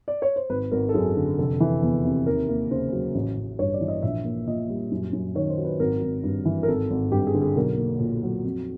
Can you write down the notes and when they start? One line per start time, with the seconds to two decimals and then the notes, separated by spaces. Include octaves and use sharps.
0.08 D5
0.22 C#5
0.36 C5
0.49 G#1 B4
0.71 G#1 A#4
0.89 A4
0.94 F#2 G#4
1.16 D3
1.38 F1 A4
1.60 E3
1.83 E2
2.05 C3
2.26 D#2 A#4
2.49 A#3
2.71 C#3 C5
2.92 F#3
3.15 A1
3.37 A1
3.59 G2 C#5
3.74 D5
3.81 E3
3.88 D#5
4.02 A#1 E5
4.25 A#3
4.47 A#2 D#5
4.69 G3
4.92 F#2
5.13 F#2
5.35 D#3 C#5
5.50 C5
5.58 F#3
5.64 B4
5.79 G#1 A#4
6.02 G#1
6.23 G2
6.45 E3
6.63 A#4
6.68 G#1 A4
6.90 G#1
7.12 G2 G4
7.27 G#4
7.34 D3
7.42 G#4
7.56 B1 A#4
7.78 A#3
8.00 A#2
8.23 F#3
8.44 F2